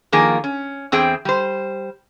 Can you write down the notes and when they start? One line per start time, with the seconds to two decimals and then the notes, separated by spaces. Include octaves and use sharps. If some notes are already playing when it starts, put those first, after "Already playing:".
0.12 D#3 F3 A#3 G#4
0.44 C#4
0.92 E2 C4 G#4 C5 G5
1.25 G3 C5